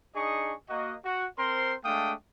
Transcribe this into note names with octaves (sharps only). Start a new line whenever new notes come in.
D4 D#4 G#4 D#5 C#6
A#3 F#4 D#5
F#4
C4 A#4 C5 C6
G#3 A3 D4 F5 G5 D#6